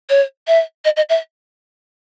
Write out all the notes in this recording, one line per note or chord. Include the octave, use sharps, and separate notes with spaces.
C#5
E5
D#5
D#5
E5